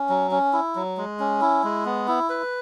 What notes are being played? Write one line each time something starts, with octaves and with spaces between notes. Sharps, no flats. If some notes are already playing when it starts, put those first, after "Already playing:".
Already playing: C#4
F#3
C#4
E4
F#3
G#3
C#4
E4
G#3
B3
E4
B4